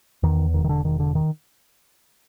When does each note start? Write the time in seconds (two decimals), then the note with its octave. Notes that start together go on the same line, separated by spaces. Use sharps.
0.23 E2 D#3
0.54 E1 D#3
0.64 D#3
0.69 D3
0.84 E1 D#3
1.00 D3
1.15 D#3